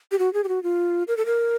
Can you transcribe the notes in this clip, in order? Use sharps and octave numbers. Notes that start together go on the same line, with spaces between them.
G4
F#4
G#4
G4
F#4
F4
A#4
A4
A#4